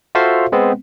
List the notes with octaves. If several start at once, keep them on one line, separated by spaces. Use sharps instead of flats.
F4 F#4 A4 C5 E5 F5
G#3 B3 C4